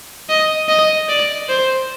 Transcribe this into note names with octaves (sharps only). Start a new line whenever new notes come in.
D#5
D#5
D5
C5